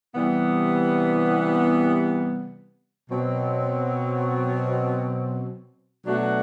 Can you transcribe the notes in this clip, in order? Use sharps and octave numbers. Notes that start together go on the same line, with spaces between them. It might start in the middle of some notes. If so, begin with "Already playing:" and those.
C3 E3 G3 B3
B2 F#3 C4
B2 F#3 A3 D4 F#4